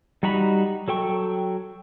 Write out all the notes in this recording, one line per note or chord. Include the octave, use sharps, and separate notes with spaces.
G3 D#4 F#4 A#5 B5
F#3 A4 G5 C#6